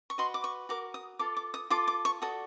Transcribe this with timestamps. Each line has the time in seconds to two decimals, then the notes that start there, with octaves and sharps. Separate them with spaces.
0.10 C#6
0.18 F#4 B4 D#5 C6
0.34 D6
0.44 C#6
0.69 F#4 A#4 D6
0.94 D#6
1.19 F4 A4 D6
1.37 D6
1.54 D#6
1.70 F4 A4 D6
1.88 D6
2.05 C#6
2.22 F#4 A4 D5 D#6